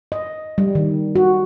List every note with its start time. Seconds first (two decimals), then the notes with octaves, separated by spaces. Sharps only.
0.12 D#5
0.58 G3
0.75 D#3
1.16 F#4